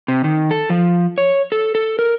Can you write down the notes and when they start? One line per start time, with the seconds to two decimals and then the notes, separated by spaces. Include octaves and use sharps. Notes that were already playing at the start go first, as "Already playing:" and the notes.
0.08 C3
0.24 D#3
0.51 A4
0.70 F3
1.18 C#5
1.52 A4
1.75 A4
1.99 A#4